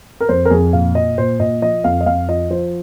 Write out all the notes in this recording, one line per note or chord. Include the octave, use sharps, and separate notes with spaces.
A#4
F2 C5
A#4
F2 G#4
A#2 F5
A#2 D#5
A#2 C5
A#2 D#5
F3 D#5
F2 F5
D#5
F2 F5
F3 D#5
F3 C5